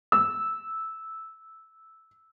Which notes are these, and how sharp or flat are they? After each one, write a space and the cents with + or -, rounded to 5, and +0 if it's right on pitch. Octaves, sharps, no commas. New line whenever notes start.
E6 -10